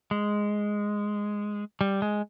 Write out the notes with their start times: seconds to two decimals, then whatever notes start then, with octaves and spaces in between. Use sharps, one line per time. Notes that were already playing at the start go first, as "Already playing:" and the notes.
0.11 G#3
1.81 G3
2.02 G#3